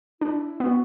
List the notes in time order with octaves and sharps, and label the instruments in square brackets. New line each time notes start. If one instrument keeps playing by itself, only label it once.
[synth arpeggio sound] D4 [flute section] E4
[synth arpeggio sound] B3 [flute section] F#4